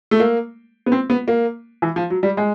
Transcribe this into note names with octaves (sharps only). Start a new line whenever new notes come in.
A3
A#3
B3
C4
B3
A#3
E3
F3
F#3
G3
G#3